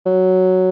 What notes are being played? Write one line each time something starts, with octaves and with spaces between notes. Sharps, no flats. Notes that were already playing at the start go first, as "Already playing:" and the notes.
F#3